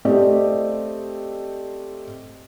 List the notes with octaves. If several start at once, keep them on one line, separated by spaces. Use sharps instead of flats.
A3 C4 G4 D5 D#5